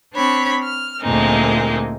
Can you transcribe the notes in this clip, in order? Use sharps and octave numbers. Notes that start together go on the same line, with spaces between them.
C4 D4 C#5 B5
F6
D2 A#2 G#3 A#3 C4 D#4